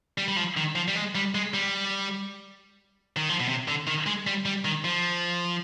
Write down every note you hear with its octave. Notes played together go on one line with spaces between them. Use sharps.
G3
G3
F3
D#3
F3
G3
G#3
G3
G#3
G3
D#3
F3
B2
C3
D3
D#3
G#3
G3
G3
D#3
F3